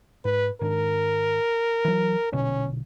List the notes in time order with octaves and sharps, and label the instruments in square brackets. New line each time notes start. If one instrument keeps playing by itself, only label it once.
[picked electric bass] G#2 [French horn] B4
[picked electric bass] G#2 D#3 D4 [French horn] A#4
[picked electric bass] E3 F#3
[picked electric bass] A#1 B2 D3 [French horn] C#4